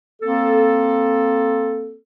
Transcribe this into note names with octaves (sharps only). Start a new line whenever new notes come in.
A#3 C4 A4